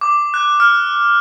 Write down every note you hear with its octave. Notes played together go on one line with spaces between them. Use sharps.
D6
F#6
F6